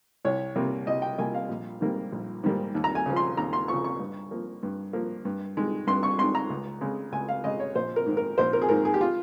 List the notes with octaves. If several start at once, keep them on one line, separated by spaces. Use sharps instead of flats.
C2 C#5
C3 G3 A#3
C2 D#5
G5
C3 G3 A#3 G#5
F5
A#1
G#2 D#3 G3 A#3
A#1
G#2 D#3 G3 A#3
D#2
A#5
G#5
C#3 F3
C6
D#2 A#5
C6
C#3 F3 C#6
C#6
G2
F3 A#3
G2
F3 A#3
G2
D#3 G#3
G2 C6
C#6
D#3 G#3 C6
A#5
C#2
C#3 G#3
C#2 G#5
F5
C#3 G#3 D#5
C#5
A#1 C5
A#4
G#2 D#3
A#4
A#1 C5
A#4
G#4
G#2 D#3 A#4
G#4
G4
F4